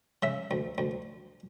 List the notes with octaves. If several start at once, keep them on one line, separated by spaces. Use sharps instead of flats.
C#3 E5
D2
D2